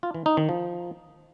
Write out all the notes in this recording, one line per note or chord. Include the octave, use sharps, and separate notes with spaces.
F4
E3
D#4
D#3
F3